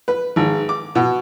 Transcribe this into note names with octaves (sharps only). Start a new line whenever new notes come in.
B4
G#1
D6
B2